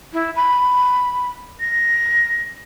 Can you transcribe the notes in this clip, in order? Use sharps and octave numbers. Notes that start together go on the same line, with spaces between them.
E4
B5
A#6